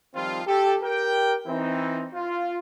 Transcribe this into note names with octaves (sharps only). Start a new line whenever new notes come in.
D#3 F3 G3 C4 F4
G4 A4
G4 A#4 G5
E3 C4 D#4
F4